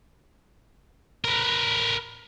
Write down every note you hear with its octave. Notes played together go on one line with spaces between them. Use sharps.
A#4 B4